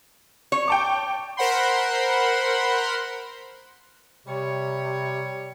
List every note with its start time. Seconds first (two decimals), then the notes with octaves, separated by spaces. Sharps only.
0.52 C#5
0.68 G5 A5 D6
1.37 A#4 C5 F#5 B5 C6
4.26 C3 G3 C#5